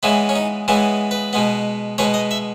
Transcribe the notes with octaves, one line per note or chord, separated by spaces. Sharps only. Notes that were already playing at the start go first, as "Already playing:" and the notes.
C#3 E3 G#3 B3 E4
C#4
D#4
C#3 E3 G#3 B3 E4
B4
B2 G#3 B3
B2 G#3 B3 C#5
D#5
E5